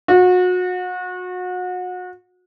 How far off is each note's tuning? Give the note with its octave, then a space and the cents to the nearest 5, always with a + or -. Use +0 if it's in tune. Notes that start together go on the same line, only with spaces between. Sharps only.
F#4 -30